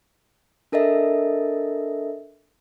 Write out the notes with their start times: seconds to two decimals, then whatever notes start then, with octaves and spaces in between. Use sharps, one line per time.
0.72 D4 A4 A#4 D#5 E5